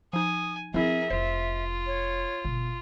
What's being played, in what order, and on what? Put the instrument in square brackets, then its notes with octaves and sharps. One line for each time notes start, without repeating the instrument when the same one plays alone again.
[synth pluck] F3 D#4 [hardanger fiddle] G#5 [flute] D#6
[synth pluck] F3 E4 [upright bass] C4 [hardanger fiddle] G#4 A#4 [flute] E5
[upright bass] F1 [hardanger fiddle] F4 [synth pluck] C5
[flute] C#5
[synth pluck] G1 [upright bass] B2